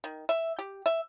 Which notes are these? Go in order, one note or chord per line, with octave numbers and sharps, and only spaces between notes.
D#3
E5
G4
E5